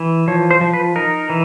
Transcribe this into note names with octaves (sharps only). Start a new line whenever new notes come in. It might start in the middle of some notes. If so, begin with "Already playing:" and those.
Already playing: E3
F3 C#5
C5
F3
B4
D#4 A#4
E3